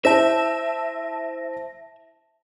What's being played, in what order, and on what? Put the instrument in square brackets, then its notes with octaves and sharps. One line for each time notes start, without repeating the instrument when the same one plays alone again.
[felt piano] E4 C5 [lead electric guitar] E5 [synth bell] A5 A#6